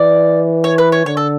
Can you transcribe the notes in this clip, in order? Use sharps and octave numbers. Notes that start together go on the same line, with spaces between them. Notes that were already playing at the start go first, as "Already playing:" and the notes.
Already playing: E3 D5
C#5
B4
C#5
D3 C#5
A4